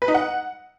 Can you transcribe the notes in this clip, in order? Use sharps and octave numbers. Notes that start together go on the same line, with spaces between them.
B4
D#4
F#5